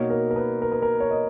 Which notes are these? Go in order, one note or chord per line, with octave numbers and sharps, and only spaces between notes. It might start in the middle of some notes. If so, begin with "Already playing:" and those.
Already playing: B2 A#3 D#4 C#5
A#4
A#4
B4
A#4
B4
A#4
C#5
D#5